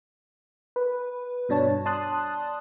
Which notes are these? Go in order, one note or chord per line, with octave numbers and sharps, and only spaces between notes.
B4
G2 B2 D4 C#5 A5
D5 A5 C6 D#6 F#6